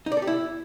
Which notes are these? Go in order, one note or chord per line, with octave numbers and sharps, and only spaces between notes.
D#4
D5
A4
G4
E4